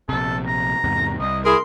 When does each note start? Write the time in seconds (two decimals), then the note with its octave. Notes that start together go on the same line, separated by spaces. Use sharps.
0.09 A#1 C3 A4
0.47 A#5
0.84 E2 G#2 C3
1.20 C2 D#5
1.45 E4 G#4 A#4 C6